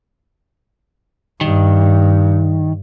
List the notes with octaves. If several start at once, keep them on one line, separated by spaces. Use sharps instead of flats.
G2 D#3